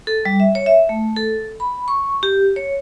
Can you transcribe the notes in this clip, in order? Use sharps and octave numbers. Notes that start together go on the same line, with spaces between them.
A4
G3
E5
C#5
E5
A3
A4
B5
C#6
G4
C#5